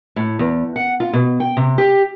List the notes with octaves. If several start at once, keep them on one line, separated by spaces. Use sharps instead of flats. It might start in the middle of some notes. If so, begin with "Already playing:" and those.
A2
E2
F#5
F4
B2
G5
C3
G4